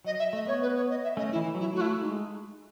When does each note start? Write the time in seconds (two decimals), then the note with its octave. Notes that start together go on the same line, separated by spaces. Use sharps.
0.05 F#3 D#5
0.19 E5
0.33 A3 D#5
0.46 B3 C#5
0.62 B4
0.76 C#5
0.90 D#5
1.03 E5
1.17 A3 C#4 D#5
1.31 E4
1.35 E3
1.55 F#3 E4
1.73 A3 F#4
1.80 E4
1.87 F#4
2.01 G#3 D#4